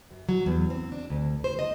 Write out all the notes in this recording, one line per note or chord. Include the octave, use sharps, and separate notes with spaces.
F#2
F#3
E2
C4
D4
D2
C5
D#5